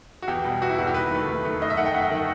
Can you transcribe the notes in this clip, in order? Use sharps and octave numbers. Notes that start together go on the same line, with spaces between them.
F#4
E2 G4
B2 G3
E2 F#4
E4
B2 G3 F#4
G4
D#2 B4
D#3 A3
D#2
D#3 A3
F#2 D#5
E5
D#3 A3 F#5
G5
F#2 F#5
D#3 A3